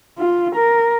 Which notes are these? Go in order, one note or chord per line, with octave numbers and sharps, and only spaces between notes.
F4
A#4